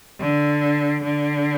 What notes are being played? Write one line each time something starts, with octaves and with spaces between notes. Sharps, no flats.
D3
D3